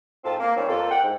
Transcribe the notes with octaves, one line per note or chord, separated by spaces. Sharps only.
G#2 C4 F4 A5
A#3
A#2 D#3 G3 C4 C#4
F2 A#3 F4 A4
F#5 G5
G#2